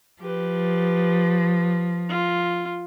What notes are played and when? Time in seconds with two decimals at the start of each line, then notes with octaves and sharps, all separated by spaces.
0.22 F3 G4 B4
2.09 F4